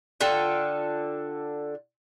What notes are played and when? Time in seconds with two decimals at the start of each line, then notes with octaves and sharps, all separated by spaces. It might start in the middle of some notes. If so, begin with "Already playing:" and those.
0.21 D3 F4 A4 G5